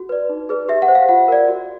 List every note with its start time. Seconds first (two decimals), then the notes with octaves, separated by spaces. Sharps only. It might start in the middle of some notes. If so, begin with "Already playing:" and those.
Already playing: F#4
0.09 B4 D5
0.29 D#4
0.49 G#4 B4 D5
0.69 G4 E5
0.82 F#5
0.88 C5
0.95 F5
1.09 F4 F#5
1.28 A#4 D5
1.48 F#4